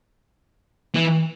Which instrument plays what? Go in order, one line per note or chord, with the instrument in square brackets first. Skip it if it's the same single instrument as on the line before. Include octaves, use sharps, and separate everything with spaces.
[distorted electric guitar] E3